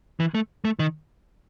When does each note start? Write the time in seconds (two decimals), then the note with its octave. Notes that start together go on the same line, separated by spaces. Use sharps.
0.20 E3
0.35 A3
0.65 A3
0.79 D#3